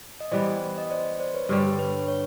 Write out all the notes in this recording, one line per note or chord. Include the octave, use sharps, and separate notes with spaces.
D#5
E3 G3 B3 C5 D5
D#5
C5 D5
C5 D5
B4 C#5
G2 D3 G3
B4 C#5
B4 C#5